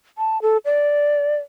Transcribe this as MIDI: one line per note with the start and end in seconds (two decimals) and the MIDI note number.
0.18 0.41 81
0.42 0.57 69
0.65 1.36 74